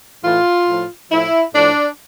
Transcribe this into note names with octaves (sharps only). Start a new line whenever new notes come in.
A2 E3 F4
A2 F3
A2 F3 E4
A2 F3 D4